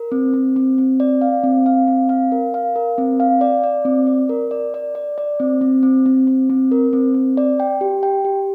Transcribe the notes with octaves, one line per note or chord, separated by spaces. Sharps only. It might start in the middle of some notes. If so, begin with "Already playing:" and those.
Already playing: A#4
C4
C4
C4
C4
D5
F5
C4
F5
C4
F5
A#4
F5
A#4
C4
F5
D5
D5
C4
D5
A#4
D5
D5
D5
D5
C4
C4
C4
C4
C4
C4
A#4
C4
C4
D5
G5
G4
G5
G4